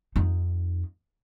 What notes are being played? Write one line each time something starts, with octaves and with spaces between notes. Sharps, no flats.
F2 D#4